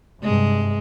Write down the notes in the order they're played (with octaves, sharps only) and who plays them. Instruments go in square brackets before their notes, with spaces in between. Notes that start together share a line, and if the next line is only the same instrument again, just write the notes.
[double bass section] G2 C3 [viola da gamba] G#3